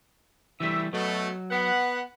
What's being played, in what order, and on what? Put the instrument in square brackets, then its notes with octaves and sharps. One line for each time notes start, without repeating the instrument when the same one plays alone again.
[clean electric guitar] E3 G3 A3 [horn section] E5
[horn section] B2 A3 [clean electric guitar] F#3
[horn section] B3 F#5